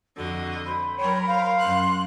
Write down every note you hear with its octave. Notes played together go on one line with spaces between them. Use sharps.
F2 D3 F#4 D#5
C5 B5
F#3 A#4 C#5 G5
C5 F5
F#2 C6 F#6